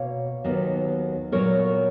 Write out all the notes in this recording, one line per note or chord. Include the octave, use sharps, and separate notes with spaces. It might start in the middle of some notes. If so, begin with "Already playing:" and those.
Already playing: B2 A#3 C#5 F5
D#2 D#3 F#3 B3
A#2 F#3 B3 A#4 C#5